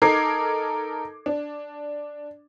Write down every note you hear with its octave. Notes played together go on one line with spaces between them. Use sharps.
D#4 A4 A#4 D6 G#6 C7
D4